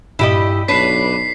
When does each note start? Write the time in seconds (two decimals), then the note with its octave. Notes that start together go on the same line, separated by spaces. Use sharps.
0.19 G2 A#2 E4 G4 D#5
0.68 B1 D4 B4 C#5 B6 C7